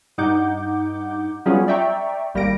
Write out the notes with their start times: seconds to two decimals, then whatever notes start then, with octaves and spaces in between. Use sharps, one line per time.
0.18 G2 D#4 F#5 D6 G6
1.46 F#3 G3 B3 C#4 F4 G#4
1.68 D5 E5 G5 A#5 C#6
2.34 G#1 G3 A#3 A#6 D7